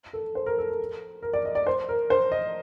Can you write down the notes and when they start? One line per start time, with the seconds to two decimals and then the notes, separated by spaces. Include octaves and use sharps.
0.13 A4
0.35 C5
0.46 A#4
0.58 A4
0.69 A#4
1.22 A#4
1.33 D5
1.45 D#5
1.55 D5
1.67 C5
1.89 A#4
2.10 C5
2.32 D#5